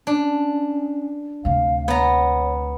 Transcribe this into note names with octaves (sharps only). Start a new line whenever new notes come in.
C#4 D4
D2 C3 F5
B3 C#5 A#5